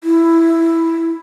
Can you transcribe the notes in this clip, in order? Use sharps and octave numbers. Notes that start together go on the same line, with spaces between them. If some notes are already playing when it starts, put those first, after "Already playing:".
E4